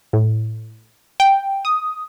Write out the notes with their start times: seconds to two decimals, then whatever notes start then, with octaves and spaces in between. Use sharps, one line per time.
0.13 A2
1.20 G5
1.65 D#6